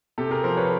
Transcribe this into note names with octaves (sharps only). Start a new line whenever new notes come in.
C3 G4 A4
G#4 A#4
F3 A#4 C5
B4 C#5